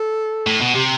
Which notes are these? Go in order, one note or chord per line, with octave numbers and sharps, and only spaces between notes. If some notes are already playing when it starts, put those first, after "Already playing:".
Already playing: A4
A2
B2
C3 G4